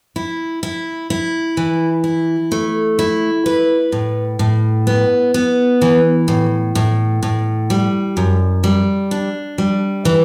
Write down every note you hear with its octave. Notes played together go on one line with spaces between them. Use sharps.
E4
E4
E4
E3
E4
A3
E4
B4
A2
A2
B3
B3
E3
A2
A2
A2
G3
F#2
G3
D4
G3
E3